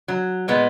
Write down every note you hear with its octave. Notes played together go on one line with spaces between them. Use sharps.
F#3
A#2 G#3 B3